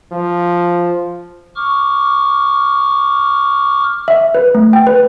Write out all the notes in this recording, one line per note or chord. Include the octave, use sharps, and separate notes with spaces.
F3
C#6 D6 F6
E5
B4
A3
G5
B4